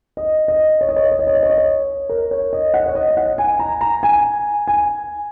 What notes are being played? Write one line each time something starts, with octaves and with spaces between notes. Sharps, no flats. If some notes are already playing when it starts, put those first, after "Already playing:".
D#5
D#5
C#5
D#5
C#5
D#5
C#5
D#5
C#5
D#5
C#5
D#5
C#5
A#4
C#5
D#5
F#5
C#5
D#5
D#5
F#5
G#5
A#5
A#5
G#5
G#5